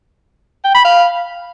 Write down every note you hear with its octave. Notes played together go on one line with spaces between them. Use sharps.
G5
B5
F5